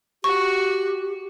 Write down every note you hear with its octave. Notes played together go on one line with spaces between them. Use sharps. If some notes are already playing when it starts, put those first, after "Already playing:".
F#4 G4 C#6